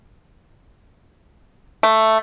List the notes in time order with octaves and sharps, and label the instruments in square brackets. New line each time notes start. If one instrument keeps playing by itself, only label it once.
[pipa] A3